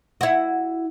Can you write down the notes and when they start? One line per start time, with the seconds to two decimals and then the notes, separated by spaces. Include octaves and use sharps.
0.21 E4 F#4